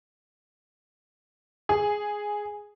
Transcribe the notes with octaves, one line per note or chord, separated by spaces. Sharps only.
G#4